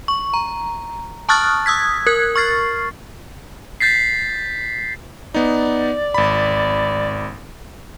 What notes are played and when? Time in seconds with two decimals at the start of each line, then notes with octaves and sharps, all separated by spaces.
0.08 C#6
0.34 A#5
1.29 A5 C#6 D#6 F6 F#6 A6
1.66 D#6 E6 G#6 B6
2.07 A#4 F#6 G#6
2.36 C#6 F6 A6 C7
3.80 G6 A6 B6 C7
5.34 B3 D#4 D5
6.14 G#1 B5